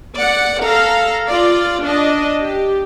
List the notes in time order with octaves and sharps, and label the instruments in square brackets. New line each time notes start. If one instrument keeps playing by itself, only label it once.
[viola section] D5 F#5
A4 F5 A#5
F4 D5
D4 D#5
G4